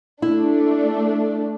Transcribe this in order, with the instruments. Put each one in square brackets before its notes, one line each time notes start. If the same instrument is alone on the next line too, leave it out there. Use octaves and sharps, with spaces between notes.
[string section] A3 D4 [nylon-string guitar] E4